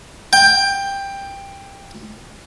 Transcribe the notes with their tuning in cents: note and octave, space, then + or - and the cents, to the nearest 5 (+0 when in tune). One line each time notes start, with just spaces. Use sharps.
G5 +15